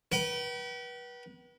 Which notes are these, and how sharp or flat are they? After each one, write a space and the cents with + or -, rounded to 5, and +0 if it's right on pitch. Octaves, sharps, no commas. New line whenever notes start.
B4 -30 G5 -45